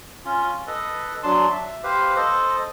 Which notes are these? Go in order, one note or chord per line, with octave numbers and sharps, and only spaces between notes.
C#4 F4
A4 B4 D#5
F#3 D4 A5 C6
E5
G4 B4 C5 F5
A4 C5 D#5